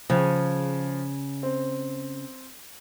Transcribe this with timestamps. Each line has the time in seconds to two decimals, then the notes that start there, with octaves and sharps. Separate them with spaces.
0.10 C#3 F3
1.43 C4